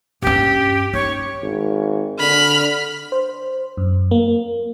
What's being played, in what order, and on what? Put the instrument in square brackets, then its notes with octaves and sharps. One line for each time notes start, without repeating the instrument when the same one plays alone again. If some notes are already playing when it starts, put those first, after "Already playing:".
[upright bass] G2 C#4 [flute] G4
[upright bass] D#4 [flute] C#5
[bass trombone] G#1
[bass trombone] D3 [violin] B5 F6
[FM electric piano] C5
F#2
A#3